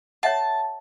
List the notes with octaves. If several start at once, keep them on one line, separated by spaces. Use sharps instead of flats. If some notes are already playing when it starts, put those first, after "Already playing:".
C#5 E5 F#5 A5